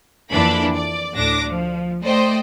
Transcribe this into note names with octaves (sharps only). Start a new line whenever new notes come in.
F2 E3 A#3 D4 B5
D5
D2 A2 D4 D6 A#6
F3
A3 C5 D5 D#5 G5